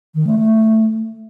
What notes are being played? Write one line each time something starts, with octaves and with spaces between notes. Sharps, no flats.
D#3
A3
A3